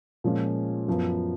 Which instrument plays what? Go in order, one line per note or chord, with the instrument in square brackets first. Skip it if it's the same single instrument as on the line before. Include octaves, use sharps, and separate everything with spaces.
[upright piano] A#2 F3 G#3 C#4
F#2 F3 B3